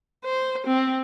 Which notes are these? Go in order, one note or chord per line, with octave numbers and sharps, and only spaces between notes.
C5
C4